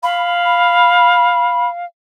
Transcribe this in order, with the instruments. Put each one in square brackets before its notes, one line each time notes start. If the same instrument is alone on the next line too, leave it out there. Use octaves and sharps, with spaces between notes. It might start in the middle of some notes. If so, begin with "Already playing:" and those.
[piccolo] F5 [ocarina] B5